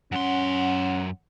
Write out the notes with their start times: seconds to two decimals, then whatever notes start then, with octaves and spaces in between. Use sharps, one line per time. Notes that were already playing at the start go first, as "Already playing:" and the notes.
0.12 F#2 C#4 F#5 C6